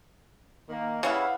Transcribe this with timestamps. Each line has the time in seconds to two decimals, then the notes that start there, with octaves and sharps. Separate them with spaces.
0.69 D#3 A#3
1.03 C#3 G3 E4 B4 F5 F#5